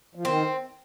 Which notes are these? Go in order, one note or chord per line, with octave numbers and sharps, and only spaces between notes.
F3
D#3 C4